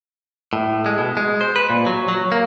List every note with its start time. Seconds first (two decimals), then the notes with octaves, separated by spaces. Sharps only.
0.53 A2
0.86 G#3
0.98 B2
1.17 G#3
1.41 C5
1.56 B4
1.70 A#2
1.87 F#3
2.09 F#3
2.32 A#3